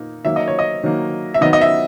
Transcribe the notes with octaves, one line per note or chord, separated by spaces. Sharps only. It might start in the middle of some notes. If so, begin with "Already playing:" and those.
Already playing: A#2 A#3 D#4
D#3 F#3 A#3 E5
D#5
C#5
D#5
D#3 F#3 A#3
E5
D#3 F#3 B3 D#5
D#5
E5